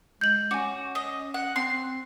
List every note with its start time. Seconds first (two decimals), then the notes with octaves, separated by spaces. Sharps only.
0.21 G#3 G6 F#7
0.51 C#4 F#4 G#5 D6
0.95 D#5
1.34 F#5
1.56 C4 C6